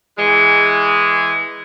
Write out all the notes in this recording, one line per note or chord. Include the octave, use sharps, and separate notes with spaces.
E3 G#3